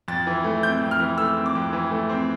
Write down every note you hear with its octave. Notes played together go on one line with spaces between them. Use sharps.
F2 A6
E3
A3
C4 G6
F2
F6
E3
A3 E6
C4
D6
F2
E3
A3
C4